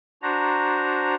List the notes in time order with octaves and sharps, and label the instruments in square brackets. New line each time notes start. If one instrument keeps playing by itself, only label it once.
[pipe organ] D4 F#4 C5 A#5